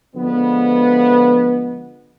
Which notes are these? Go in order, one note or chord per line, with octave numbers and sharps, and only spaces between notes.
D3 F3 G#3 B3